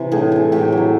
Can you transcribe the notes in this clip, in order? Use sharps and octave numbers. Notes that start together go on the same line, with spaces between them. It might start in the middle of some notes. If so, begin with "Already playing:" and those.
Already playing: C3 E3
A2 G#4
E3 A3
A2 G4
F#3 A3